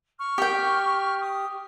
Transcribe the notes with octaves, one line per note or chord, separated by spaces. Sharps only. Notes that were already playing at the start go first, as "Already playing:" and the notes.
C#6 F6
G4 G5
D#6